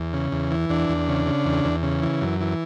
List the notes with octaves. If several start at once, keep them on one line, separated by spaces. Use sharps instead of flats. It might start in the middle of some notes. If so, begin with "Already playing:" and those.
Already playing: E2
C#3
E2
E3
E2 D4
E2
C#3
C#3
E2
E2
C#3
E3
F#2
E3